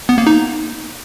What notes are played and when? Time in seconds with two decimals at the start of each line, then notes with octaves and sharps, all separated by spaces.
0.09 B3
0.18 A#3
0.27 D#4